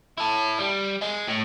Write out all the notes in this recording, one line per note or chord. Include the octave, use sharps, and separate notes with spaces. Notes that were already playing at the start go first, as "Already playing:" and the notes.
E4 A5
G3
D#5 G#5
A2